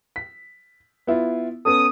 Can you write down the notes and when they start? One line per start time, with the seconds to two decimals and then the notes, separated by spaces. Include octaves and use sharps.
0.16 B6
1.07 B3 E4 F4
1.65 B3 C#4 A4 D#6